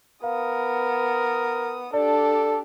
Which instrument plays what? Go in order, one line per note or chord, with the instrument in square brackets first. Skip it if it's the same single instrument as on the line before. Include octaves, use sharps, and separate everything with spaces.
[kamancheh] B3 D#6 [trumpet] A#4 [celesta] F5
[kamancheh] D4 G4 [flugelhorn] A4 [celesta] D5